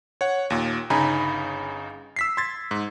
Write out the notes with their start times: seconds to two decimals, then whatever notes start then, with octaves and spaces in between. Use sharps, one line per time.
0.21 C#5 F#5
0.50 D#2 A#2
0.90 G1 C#3 D#4 G#5 A#5 B5
2.16 E6 B6 C7
2.37 C6 G#6 A6
2.71 G#2